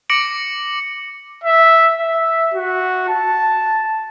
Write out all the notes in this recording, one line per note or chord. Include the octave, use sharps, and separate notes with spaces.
D6 A#6 C#7 D7 F#7
E5
E5
F#4
A5